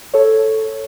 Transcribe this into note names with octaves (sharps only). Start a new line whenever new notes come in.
A4 C#5